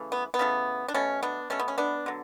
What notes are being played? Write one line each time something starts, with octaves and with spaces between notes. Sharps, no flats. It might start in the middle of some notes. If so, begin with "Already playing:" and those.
Already playing: C#3 E3 A3
B3
B3
C#3 E3 A3
D4
B2 A3 C#4
B3 D4
B2 A3 C#4
B3
C#4
B3 D4
D3 F#3